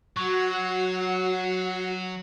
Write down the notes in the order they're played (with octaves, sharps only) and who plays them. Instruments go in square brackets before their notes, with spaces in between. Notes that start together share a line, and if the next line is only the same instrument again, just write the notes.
[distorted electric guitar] F#3 [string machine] F#4 F#5 C7 [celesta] C#6